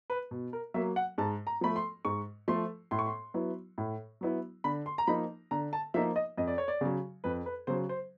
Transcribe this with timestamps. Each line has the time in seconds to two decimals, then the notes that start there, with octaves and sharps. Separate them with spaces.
0.10 B4
0.31 B2
0.53 A#4
0.74 F#3 A#3 E5
0.96 F#5
1.18 G#2 A5
1.47 A#5
1.61 F3 A3 B5
1.76 C6
2.05 G#2 C#6
2.48 F3 A3 C6
2.91 A2 C6
2.99 C#6
3.06 C6
3.34 F#3 B3 E4
3.78 A2
4.21 F#3 B3 E4
4.64 D3 B5
4.86 C6
4.98 A#5
5.07 F3 A#3 D#4 B5
5.51 D3 A#5
5.73 A5
5.94 F3 A#3 D#4 E5
6.16 D#5
6.38 F2 D#5
6.47 D5
6.58 C#5
6.68 D5
6.81 C#3 F#3
7.24 F2 B4
7.46 B4
7.67 C#3 F#3 C5
7.89 C5